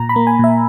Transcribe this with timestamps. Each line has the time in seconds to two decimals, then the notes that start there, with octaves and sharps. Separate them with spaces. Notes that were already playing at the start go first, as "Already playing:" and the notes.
Already playing: A#2 A#5
0.09 B5
0.16 A#3
0.27 G#5
0.39 A#2 E5